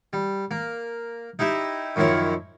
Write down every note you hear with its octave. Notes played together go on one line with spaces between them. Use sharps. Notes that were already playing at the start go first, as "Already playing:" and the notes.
G3
A#3
D#4 E4 G4 E5
F#2 D#3 F3 E4 C#5